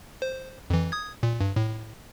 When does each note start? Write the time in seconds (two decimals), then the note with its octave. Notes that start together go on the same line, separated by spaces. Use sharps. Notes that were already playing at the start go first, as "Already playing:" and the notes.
0.22 C5
0.70 F2 E3
0.92 D#6 G#6
1.23 A#2
1.40 G2
1.56 A2